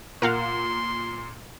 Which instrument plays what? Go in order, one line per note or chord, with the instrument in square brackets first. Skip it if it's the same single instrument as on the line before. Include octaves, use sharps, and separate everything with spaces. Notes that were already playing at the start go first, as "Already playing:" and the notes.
[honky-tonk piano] A#2 [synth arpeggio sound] A#4 F5 F#5 [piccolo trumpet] C6